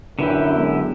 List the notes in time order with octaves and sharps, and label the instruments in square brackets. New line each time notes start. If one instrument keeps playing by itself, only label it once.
[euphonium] F#2 [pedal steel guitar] D3 E4 G4 [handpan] D4 B4
[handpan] F#3 G#3 B3